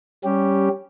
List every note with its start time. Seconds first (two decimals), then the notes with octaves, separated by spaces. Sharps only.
0.24 G3 C#4 G4